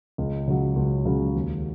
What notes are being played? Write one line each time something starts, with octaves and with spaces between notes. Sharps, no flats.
C#2
C#3 F#3
C#2
C#3 F#3
D#2